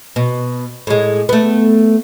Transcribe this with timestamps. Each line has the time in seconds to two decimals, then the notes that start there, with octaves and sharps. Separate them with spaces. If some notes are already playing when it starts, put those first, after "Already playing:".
0.16 B2
0.87 A2 G#3
1.29 A3 B3